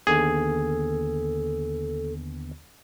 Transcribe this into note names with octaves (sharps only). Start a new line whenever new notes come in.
D#2 D3 B3 G#4 A4